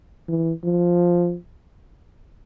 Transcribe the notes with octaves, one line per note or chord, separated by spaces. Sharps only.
E3
F3